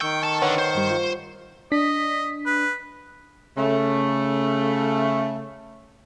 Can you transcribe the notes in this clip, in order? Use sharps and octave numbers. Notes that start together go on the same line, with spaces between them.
D#3 G5 C#6 E6
A4 A5
D3 B4 C#5 F#5
C5
G2 G3
F4
D4 D#5 B6
B4
C#3 A3